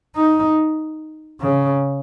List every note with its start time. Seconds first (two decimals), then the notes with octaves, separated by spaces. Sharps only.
0.16 D#4
1.41 C#3